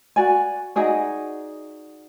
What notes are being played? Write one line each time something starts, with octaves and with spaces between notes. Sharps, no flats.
F#4 D5 G#5
D#4 F#4 G#4 D5